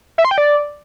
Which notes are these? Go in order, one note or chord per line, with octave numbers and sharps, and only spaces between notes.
E5
C6
G5
D5